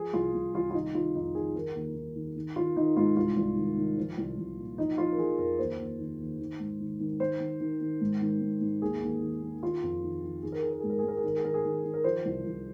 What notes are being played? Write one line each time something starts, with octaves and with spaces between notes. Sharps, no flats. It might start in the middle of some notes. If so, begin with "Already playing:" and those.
Already playing: F3 G#4
C2 F4
C2
C2 F4
F4
D#3 D#4
D#3 F4
F2 D#4
D#3 G#4
D#3 A#4
D#2
D#2
D#3
D#3
D#3 F4
D#3 D#4
G#2 F4
C2 F4
C2
D#3
D#3
F3
C2
C2
A#2
F3 D#4
F3 F4
A#4
F3 G#4
F2 A#4
D#2 C5
D#2
D#3
D#2
D#3
G#2
D#3
D#3
D#3 C5
D#3
D#3
D#3
G#2
D#3
G#2
G#2
D#2 G#4
D#2
D#3
D#3
D#3 F4
F2
D#3
D#3
D#3 G#4
A#4
D#3 G#4
A#4
G#2 G#4
A#4
G#4
G#2 A#4
G#4
D#3 A#4
G#4
D#3 A#4
G#4
D#3
D#3
A#4
F3 C5
C2
C2